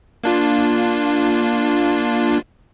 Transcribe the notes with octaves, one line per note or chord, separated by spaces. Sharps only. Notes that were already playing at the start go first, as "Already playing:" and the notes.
A#3 D4 F4